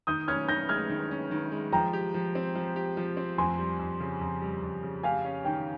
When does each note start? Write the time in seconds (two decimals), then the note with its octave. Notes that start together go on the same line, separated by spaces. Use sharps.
0.07 D#3 D#6 G6
0.28 C#4 F6 G#6
0.48 D#3 G6 A#6
0.69 G#3 F6 G#6
0.90 D#3
1.11 C#4
1.31 D#3
1.51 G#3
1.72 F3 G5 A#5
1.93 G4
2.14 F3
2.35 C4
2.55 F3
2.76 G4
2.97 F3
3.17 C4
3.38 F2 G#5 C6
3.59 G3
3.79 F2
4.00 C#3
4.21 F2
4.42 G3
4.63 F2
4.83 C#3
5.03 G4 F5 G#5
5.25 C#4
5.45 D#3 G5